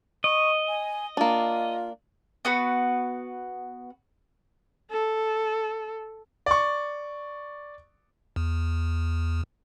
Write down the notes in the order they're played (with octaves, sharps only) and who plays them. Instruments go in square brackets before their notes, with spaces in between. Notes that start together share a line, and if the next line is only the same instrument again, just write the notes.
[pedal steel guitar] D#5 [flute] C#6
[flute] G#5
[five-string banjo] A#3 D4 [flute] F4
[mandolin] B3 F#4 B4
[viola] A4
[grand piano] D5 C#6
[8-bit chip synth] E2